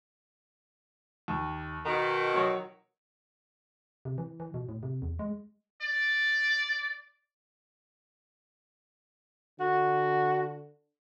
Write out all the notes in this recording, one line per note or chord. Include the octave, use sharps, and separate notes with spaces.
D#2
B2 D#3 A#4
F#3 C#5
C3
E3
E3
B2
A2
C3
E2
G#3
D5
D3 F#4